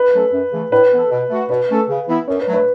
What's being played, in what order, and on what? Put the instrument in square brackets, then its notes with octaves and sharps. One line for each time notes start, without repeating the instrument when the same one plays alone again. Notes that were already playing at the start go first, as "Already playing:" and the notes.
Already playing: [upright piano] B4
[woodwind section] F#3 A3 C#4 A4
F#2
C#3 E3 A3
[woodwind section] A2 [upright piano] B4
[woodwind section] E3 B3 A4
B2
A3 F#4
[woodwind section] B2 [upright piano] B4
[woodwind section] A3 C#4 A4
C#3
E3 B3 E4
[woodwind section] F#2 [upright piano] C#5
[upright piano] B4
[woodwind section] F#3 A3
[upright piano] B4